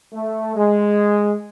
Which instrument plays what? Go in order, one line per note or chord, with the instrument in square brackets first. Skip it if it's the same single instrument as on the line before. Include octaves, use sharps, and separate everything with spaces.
[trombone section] A3
G#3